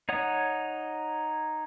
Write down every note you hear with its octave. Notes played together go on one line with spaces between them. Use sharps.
D#4 C#5 F#5 D#6